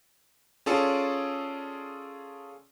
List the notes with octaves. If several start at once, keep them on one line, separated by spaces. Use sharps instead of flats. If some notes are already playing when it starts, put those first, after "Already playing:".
C#4 F4 G#4 A4 D5